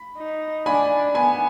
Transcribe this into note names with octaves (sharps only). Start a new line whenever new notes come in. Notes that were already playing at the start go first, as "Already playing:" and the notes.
Already playing: B5
D#4
D4 G#5 B5
B3 G#5 B5